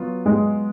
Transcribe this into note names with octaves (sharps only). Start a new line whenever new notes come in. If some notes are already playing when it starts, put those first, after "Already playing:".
Already playing: F#3 B3 F4
G#3